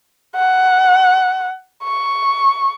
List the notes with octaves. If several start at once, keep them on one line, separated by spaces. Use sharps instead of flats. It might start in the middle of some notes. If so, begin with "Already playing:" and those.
F#5
C#6